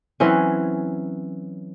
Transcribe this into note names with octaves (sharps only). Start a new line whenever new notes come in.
E3 F#3 C4 C#4